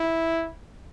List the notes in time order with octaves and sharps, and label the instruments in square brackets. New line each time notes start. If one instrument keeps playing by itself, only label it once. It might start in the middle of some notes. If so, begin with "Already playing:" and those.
Already playing: [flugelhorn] E4